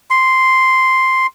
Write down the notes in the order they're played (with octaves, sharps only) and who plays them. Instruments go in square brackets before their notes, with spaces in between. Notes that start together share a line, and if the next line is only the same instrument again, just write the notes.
[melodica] C6